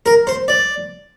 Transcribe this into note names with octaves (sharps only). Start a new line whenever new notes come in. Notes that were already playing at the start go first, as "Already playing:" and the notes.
A#4
C5
D5